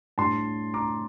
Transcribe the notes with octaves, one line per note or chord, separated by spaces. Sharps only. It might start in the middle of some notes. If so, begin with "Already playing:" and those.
A2 G3 D4 A5 C6
A#5 D6